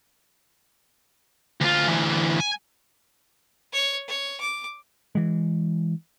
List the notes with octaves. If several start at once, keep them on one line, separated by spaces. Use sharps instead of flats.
D2 F4
D2 E3
G#5
C#5
C#5
D6
E3 G#3